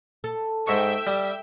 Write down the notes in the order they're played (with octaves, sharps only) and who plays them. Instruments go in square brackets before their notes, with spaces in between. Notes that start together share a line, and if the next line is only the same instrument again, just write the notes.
[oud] A4
[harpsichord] G#2 C#6 [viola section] E5 G5
[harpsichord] G3